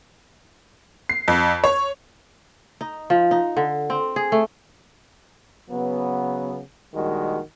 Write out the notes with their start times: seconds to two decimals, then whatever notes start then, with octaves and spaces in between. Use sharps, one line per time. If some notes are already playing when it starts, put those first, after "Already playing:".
1.09 C7
1.28 F2
1.64 C#5
2.81 D#4
3.10 F3
3.31 D#4
3.57 D3
3.90 C4
4.16 G#4
4.32 A3
5.70 C#3 F#3 B3
6.94 A#1 D#3 G3 G#3 F#4